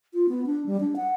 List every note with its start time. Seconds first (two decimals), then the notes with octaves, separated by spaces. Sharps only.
0.14 F4
0.29 B3
0.46 D4
0.66 G3
0.80 D4
0.96 F#5